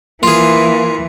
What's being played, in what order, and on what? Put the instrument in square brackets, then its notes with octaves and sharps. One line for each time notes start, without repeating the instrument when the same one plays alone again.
[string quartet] E3 [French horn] A#3 [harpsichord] F4 G#4